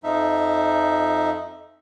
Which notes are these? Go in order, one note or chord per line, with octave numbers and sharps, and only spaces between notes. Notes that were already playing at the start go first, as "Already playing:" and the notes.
F2 F3 D#4 E5